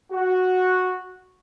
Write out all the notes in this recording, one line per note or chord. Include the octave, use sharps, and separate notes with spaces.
F#4